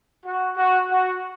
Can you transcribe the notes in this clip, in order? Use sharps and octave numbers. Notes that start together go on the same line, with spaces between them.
F#4
F#4
F#4